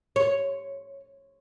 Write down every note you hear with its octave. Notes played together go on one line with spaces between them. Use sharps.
C#5